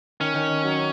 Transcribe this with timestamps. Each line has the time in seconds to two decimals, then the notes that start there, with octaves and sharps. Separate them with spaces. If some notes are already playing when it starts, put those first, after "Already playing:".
0.20 D#3 C#4
0.34 D#3
0.49 D#3
0.64 F#3